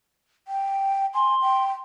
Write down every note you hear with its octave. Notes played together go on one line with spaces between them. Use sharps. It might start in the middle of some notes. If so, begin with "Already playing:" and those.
G5
G#5 C6
G5